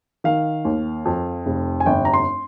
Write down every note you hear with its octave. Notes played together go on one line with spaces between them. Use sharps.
D#3 F5
D#2
F2
F1
G#5
G1 G5
A#5
C6